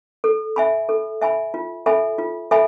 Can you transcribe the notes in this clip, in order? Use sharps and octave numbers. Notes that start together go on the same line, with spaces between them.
A4
E5 G#5 B5
A4
E5 G#5 B5
F4
A4 E5 G#5 B5
F4
A4 E5 G#5 B5